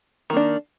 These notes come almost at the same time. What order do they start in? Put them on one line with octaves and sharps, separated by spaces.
D#3 A#3 D4